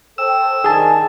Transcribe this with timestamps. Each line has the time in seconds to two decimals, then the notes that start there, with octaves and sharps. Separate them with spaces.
0.18 A4 C5 G5 E6
0.64 D#3 D4 G#4 G#5 A5